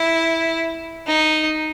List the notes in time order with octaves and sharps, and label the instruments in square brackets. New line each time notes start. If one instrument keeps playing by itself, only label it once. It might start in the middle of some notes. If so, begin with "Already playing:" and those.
Already playing: [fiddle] E4
D#4